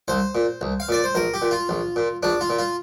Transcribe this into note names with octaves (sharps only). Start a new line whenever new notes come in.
C2 C5
A#2
C2
F5
A#2 D5
C5
A#1 A#4
G4
A#2
F4
A#1
A#2
A#1 D4
F4
A#2
F4